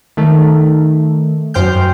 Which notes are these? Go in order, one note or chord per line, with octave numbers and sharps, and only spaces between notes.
D#3 A3
F#2 C5 G5 F6 G6